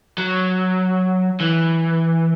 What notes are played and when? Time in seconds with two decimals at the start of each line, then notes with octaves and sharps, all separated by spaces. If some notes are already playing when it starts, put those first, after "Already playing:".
0.18 F#3
1.41 E3